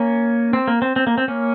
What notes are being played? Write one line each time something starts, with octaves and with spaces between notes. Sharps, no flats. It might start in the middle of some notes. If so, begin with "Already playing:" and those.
Already playing: A#3 C#4
C4
A#3
C4
C4
A#3
C4
A#3 C#4